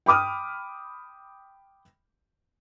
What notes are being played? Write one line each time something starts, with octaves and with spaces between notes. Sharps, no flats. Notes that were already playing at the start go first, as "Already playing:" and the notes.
G5 B5 D6 D#6 F6